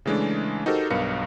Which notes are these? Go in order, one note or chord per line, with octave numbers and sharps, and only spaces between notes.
C#3 E3 G#3 A3 D4
D#4 F#4 G4 A4 A#4 C5
B1 G2 B3 A#4 F5 C#7